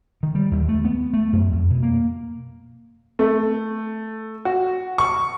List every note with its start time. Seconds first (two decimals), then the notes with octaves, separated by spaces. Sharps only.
0.23 D#3
0.35 G3
0.51 D#2
0.68 A3
0.85 B3
1.13 A3
1.33 F#2
1.53 F2
1.70 B2
1.83 A#3
3.19 A3
4.45 F#4
4.98 C#6